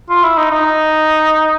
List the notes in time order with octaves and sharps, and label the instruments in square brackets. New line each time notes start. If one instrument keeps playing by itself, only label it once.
[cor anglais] F4
E4
D#4
D#4